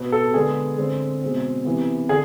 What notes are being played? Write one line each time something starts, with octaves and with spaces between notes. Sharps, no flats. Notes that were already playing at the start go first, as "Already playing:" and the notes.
Already playing: B2 B3
A4
D3 G#3 B3 G#4
D3 G#3 C4
B2 G#3 C4
C3 E3 B3
D3 G#4